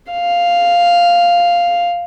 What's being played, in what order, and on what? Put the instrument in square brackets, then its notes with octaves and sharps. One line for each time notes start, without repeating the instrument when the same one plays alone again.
[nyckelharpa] F5